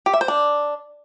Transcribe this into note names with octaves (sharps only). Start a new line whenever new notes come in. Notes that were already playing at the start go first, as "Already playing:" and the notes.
G4
E5
C5
D4